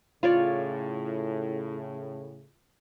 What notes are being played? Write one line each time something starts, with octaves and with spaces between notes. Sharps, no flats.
A2 C#3 F4 C#5 D5